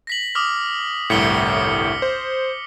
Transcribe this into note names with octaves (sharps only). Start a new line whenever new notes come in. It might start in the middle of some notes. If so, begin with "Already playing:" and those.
A#6 B6 F#7
D6 D#6 F6
G1 C2 A2 B6 C#7 G7
C5